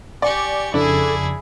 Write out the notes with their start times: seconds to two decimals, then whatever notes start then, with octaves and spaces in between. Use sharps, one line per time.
0.22 G4 D5 G#5 C#6
0.74 F2 C#3 D4 E4 G#4 A4